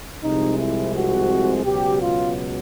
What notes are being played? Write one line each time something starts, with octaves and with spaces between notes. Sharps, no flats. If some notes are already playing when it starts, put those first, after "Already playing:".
C2 C3 F3 G#3 D#4
E4
F#4
C#2 B2 F#3 G4
F4